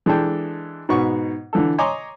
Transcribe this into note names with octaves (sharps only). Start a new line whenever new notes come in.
E3 G#3 D4 A4 G5
G#2 B2 B3 C#6
D3 E3 A4
C#5 D#5 G#5 A#5 C6 D6